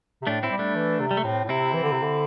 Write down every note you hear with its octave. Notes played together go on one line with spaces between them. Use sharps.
C3
A2 A3 D4
C4 E4
G3
A3 D4
E3
C3
G3
A3
A2 C4
A2
C3 C4 E4
E3
D3
C3
D3